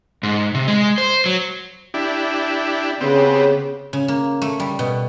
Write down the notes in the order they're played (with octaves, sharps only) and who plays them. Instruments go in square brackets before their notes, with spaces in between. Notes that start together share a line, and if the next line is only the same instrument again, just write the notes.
[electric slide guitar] G#2
C3
G#3
C5
F#3
[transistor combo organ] D4 E4 G4
[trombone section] C#3 [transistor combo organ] B3 C4 G4
[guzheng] C#3
A#3
A3
G3
B2